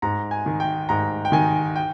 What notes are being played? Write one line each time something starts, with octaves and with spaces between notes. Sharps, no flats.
G#2 A#5
G#5
D#3
G5
G#2 A#5
G5
D#3 G#5
G5